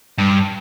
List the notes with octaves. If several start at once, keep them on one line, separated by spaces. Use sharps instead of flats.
G2